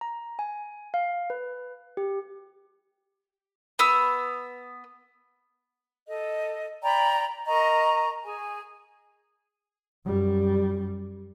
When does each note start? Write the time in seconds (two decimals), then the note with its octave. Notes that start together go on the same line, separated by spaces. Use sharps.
0.01 A#5
0.39 G#5
0.94 F5
1.30 B4
1.97 G4
3.79 B3 E6
6.08 A4 D#5
6.83 D5 G5 A#5 B5
7.47 A#4 D#5 A#5 C#6
8.24 G#4 G#5
10.06 F#2 G3